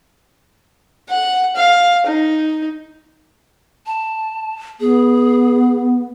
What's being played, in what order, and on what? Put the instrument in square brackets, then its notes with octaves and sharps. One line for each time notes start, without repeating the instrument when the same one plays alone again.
[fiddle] F#5
F5
D#4
[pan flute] A5
[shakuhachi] B3 [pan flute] G#4